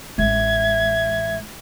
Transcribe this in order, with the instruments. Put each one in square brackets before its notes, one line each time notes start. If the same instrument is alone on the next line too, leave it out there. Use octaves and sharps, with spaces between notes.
[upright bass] A1 G#3 [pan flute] E5 [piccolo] G#6